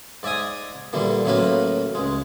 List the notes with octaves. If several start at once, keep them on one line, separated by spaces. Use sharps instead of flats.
G#2 D5 E5 G#5 D#6
A#2 D3 E3 G3
A1 A2 F#3 A#3 B4 F5
C#2 G#3